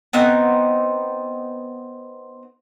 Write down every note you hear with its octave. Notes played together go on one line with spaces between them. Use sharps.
B3 C4 D#4 F#5